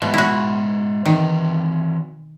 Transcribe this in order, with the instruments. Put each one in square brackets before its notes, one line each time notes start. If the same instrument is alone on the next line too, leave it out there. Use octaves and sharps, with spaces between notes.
[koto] B2 [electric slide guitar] G#3 C5 E5
[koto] E4 F#4
[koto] D#3 [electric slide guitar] E3 C4